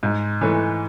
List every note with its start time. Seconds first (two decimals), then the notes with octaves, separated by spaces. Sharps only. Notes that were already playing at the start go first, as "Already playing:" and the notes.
0.03 G#2
0.41 E3 A3